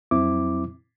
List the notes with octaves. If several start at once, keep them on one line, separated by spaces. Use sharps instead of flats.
F2 F#3 C4 E4 D6